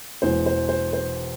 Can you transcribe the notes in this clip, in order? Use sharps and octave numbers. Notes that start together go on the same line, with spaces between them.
E1 E2 E3 C5
C5
C5
C5